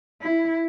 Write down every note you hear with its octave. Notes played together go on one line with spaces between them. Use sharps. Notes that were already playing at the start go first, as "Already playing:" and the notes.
E4